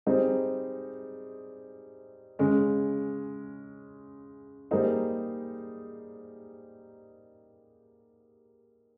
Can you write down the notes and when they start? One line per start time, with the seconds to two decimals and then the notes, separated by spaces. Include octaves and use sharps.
0.06 G3 C4 D#4 G#4 C5
2.39 C#3 G#3 C#4
4.71 G3 A#3 D#4 G#4 C5